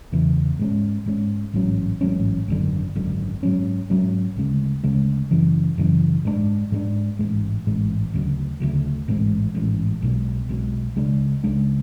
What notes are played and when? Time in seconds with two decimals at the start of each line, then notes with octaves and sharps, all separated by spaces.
0.12 E2 C#3 E3
0.59 G#2 G#3 C#4
1.06 G#2 G#3 C#4
1.53 A1 G#2 F#3 C#4
2.01 A1 G#2 F#3 C#4
2.48 G#1 F#2 D3
2.95 G#1 F#2 D3
3.43 G#2 F#3 C#4
3.90 G#2 F#3 C#4
4.37 D2 C#3 G#3
4.83 D2 C#3 G#3
5.31 F#2 C#3 E3
5.78 F#2 C#3 E3
6.25 G#2 G#3 B3 D4
6.72 G#2 G#3 B3 D4
7.19 A1 G#2 G#3
7.67 A1 G#2 G#3
8.13 D2 C#3 F#3
8.60 D2 C#3 F#3
9.08 A1 G#2 G#3
9.55 A1 G#2 G#3
10.02 B1 B2 G#3
10.49 B1 B2 G#3
10.96 C#2 C#3 G#3 D4
11.44 C#2 C#3 G#3 D4